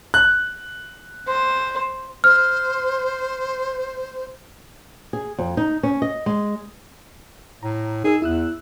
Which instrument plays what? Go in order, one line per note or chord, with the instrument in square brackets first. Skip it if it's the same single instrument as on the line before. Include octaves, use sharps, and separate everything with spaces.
[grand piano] F#6
[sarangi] C5
[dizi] C5 [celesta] F6
[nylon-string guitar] G#4
F2
D#4
C#4
D#5
G#3
[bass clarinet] A2 [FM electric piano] A#5
[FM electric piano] D#4 A#4 E6 [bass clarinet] G#4
[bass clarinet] E2 [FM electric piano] E4 E6 F#6